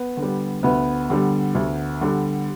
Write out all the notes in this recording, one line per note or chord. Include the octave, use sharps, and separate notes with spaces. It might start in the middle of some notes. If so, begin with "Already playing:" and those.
Already playing: B3 B4
D3
G3
D2 B3 B4
D3 G3
D2
D3 G3